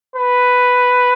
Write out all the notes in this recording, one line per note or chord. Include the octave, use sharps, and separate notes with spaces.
B4